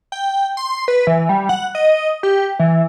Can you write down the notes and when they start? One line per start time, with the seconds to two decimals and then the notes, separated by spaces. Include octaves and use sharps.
0.12 G5
0.57 C6
0.88 B4
1.07 E3
1.29 G3
1.49 F#5
1.75 D#5
2.23 G4
2.59 E3